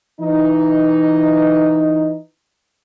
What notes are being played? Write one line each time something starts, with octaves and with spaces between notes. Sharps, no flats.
E3 D#4